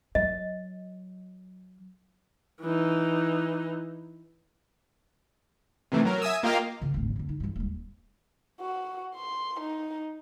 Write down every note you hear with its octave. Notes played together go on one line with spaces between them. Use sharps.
F#3 D#5
E3 D#4
C3 D#3 E3 A3
F#3 A#4
E5 G#5 D#6 E6
A#3 F4 G4 A#4 D#5 F5
C#3 F4
D1 G#1
F2 D3
D#4
E2 G2
D#1 G3
F#4
C6
D#4